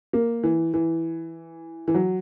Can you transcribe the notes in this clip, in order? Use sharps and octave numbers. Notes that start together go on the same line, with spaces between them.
A#3
E3
E3
E3
F#3